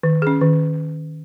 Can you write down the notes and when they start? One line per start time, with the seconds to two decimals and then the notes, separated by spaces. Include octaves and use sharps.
0.03 D#3
0.22 C#4 G#4
0.41 D#3